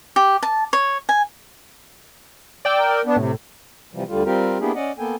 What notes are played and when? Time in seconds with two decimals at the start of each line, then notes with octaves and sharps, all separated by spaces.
0.16 G4
0.43 A5
0.73 C#5
1.09 G#5
2.65 D5 G5 E6
2.78 A#4
3.05 B3 D4
3.16 A2 C3
3.94 C3 E3 F3 G3
4.08 D2 D3 G3 F4
4.26 G3 C4 F4 G4 A#4
4.60 A#3 B3 D4 E4 G4 G#4
4.76 C#4 D5 D#5 F#5
4.98 A#3 B3 A4 G5 G#5